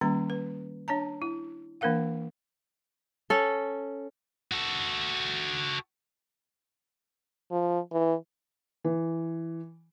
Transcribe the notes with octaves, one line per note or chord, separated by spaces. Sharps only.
D#3 G3 A#3 C#4 A#5
B4
D4 C#5 A5 A#5
E4
E3 A#3 D4 A#4 F5 F#5
C#4 A4
F#4 A4
F3
E3
E3